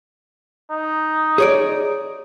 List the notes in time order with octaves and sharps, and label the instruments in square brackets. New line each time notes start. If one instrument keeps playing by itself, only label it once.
[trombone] D#4
[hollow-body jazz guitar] G#4 C#5 D5